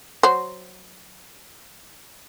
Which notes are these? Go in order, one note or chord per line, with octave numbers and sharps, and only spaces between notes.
F#3 C5